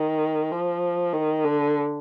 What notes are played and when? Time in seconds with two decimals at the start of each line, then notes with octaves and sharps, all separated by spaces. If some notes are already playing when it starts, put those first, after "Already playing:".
Already playing: D#3
0.52 F3
1.13 D#3
1.44 D3